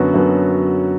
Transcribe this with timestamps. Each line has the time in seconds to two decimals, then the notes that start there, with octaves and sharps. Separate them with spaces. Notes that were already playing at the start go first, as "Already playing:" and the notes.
Already playing: F#2 D3 F#3 B3 F#4
0.14 F#2 D3 F#3 B3